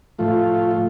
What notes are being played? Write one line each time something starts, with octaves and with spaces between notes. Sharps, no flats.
A2 F3 A3 F4
F4